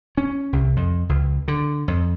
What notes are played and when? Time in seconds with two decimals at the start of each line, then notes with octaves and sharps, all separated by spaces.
0.18 C#4
0.53 C2
0.77 F2
1.09 C#2
1.48 D3
1.88 F2